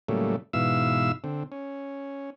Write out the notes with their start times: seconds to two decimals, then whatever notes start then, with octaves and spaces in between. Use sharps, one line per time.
0.09 A2 C#3 F#3 G3 A3 A#3
0.53 G#2 B2 E3 E5 F5 E6
1.24 D3 C4
1.52 C#4